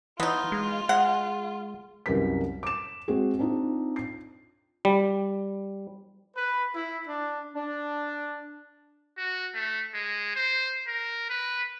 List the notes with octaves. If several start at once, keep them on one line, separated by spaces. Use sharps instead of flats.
E3 B3 D#4 F4
G#3
G#3 F#5
C2 F#2 A#4 B4 B6
D6 E7
G#3 C4 F#4 G#4
C4 D4 D#4 F4
C7
G3
B4
E4
D4
D4
F#4
A3
G#3
C5
A#4
B4